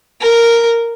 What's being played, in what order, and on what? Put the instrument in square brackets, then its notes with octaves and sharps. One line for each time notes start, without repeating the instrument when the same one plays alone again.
[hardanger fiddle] A#4